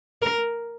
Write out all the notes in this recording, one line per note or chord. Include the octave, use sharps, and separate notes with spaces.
A#4